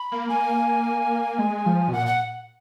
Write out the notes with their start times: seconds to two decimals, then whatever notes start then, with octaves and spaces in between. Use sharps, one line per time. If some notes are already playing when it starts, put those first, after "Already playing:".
Already playing: B5
0.12 A#3
0.29 A#3 G#5
1.38 G#3
1.66 F3
1.88 B2
1.93 A#2 F#5
2.06 F#5